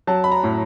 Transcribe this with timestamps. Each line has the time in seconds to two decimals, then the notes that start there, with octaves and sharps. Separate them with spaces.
0.07 F#3 A5
0.24 B5
0.32 A#5
0.44 A2